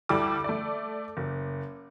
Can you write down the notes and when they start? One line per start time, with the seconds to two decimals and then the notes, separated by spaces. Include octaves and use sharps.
0.09 D2 G3 E4 G4 A4 D6
0.44 A3 D5
1.17 F#1